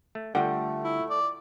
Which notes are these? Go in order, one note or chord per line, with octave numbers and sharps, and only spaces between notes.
A3
D3 G3 A3 F4 F#5 G5
E4
D5